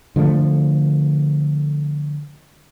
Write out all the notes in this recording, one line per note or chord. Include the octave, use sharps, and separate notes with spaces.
D3 F3 G3 A3